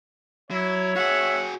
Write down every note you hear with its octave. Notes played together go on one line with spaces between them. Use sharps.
F#3 E4 C#5
F#4 G#4 E5 F#5